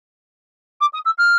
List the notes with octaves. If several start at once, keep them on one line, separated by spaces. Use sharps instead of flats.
D6
D#6
E6
F6